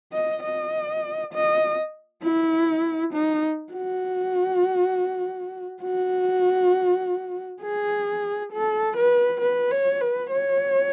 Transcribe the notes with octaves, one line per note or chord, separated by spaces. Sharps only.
D#5
D#5
D#5
E4
D#4
F#4
F#4
G#4
A4
B4
B4
C#5
B4
C#5